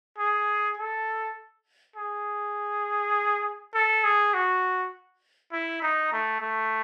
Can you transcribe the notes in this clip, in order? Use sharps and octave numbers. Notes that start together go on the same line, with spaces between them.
G#4
A4
G#4
A4
G#4
F#4
E4
D#4
A3
A3